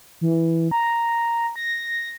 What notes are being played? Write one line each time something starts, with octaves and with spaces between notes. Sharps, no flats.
E3
A#5
A#6